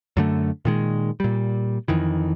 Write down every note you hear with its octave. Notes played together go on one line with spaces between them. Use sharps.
F#2 D3 A3
A#2 D#3 G#3
A#2 G3
F2 D#3 E3